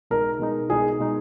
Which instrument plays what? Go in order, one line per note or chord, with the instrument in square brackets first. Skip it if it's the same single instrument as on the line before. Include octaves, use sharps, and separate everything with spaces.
[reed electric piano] B2 G#3 D#4 [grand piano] A#4
[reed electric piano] B2 G#3 D#4
[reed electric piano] B2 G#3 D#4 [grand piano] G#4
[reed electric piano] B2 G#3 D#4